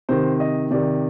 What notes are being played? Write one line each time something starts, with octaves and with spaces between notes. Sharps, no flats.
C3 D#3 C5
D#5
C3 D#3 D5